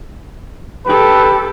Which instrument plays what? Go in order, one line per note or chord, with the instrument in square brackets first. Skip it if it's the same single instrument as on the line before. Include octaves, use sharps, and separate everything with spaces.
[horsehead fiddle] G4 A4 [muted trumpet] B4